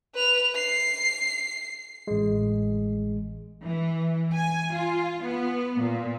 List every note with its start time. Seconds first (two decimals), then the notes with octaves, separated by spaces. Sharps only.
0.14 B4 F7
0.55 C7
2.07 A1 G#3
3.64 E3
4.34 G#5
4.74 F4
5.23 B3
5.79 A#2